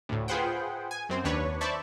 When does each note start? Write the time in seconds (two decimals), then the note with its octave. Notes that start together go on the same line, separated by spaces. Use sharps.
0.09 D2 A2
0.28 F4 G#4 B4 C5 F#5 G5
0.91 G#5
1.09 F#2 C4 C5
1.24 D#2 D4 B4 C#5
1.61 C5 D5 E5 A5 B5 C#6